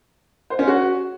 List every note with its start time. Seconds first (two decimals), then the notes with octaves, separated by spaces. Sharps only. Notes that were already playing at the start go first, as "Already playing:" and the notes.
0.50 C5
0.59 C#4
0.67 F#4